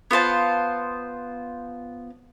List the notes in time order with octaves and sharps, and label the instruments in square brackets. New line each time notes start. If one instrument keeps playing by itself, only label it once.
[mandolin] B3 F4 C5 A5